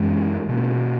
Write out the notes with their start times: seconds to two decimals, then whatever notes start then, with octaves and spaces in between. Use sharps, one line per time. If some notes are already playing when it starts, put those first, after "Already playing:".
Already playing: F#2 E3 G#3 C#4
0.49 B2 A#3 C#4